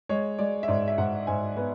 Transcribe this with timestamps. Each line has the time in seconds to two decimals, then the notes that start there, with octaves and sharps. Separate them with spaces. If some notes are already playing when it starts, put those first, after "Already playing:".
0.09 G#3 C#5
0.39 G#3 D5
0.63 E5
0.68 G#2 D5
0.88 E5
0.98 G#2 F#5
1.27 G#2 G#5
1.57 B3 B4